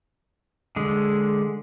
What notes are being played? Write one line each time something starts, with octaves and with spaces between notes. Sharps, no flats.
D3 G#3